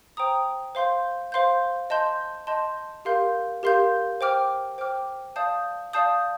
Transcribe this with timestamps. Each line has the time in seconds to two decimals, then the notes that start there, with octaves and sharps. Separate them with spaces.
0.17 C5 G5 A#5 D#6
0.75 C5 F5 C6 G6
1.32 C5 F5 C6 G6
1.90 D#5 A5 C6 G6
2.47 D#5 A5 C6 G6
3.05 G4 A#4 F5 C6 G6
3.63 G4 A#4 F5 C6 G6
4.21 C5 G5 D6 F6
4.78 C5 G5 D6 F6
5.36 D5 F5 A5 D#6 G6
5.93 D5 F5 A5 D#6 G6